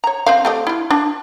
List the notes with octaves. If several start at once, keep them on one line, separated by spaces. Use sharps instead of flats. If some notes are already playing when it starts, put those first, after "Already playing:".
C#5 A#5
C4 C5 F5
A3 G4 D#5
E4 F4
D4